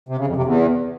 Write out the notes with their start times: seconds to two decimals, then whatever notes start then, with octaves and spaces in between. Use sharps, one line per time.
0.09 C3
0.18 C#3
0.27 F2
0.36 C3
0.45 E2